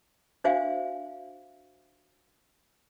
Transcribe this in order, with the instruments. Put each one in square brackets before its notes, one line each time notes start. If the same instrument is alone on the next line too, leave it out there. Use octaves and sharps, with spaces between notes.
[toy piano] D4 F#4 C5 E5 F5 G#5